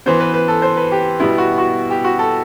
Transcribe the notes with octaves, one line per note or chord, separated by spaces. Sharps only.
E3 B3 C5
B4
B4
A4
C5
B4
G4
B2 G3 B3 E4
F#4
F#4
G4
F#4
A4